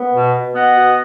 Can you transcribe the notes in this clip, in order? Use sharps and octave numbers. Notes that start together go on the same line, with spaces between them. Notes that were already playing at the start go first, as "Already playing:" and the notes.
Already playing: B3
B2
B2
B3 D#5 F#5
B2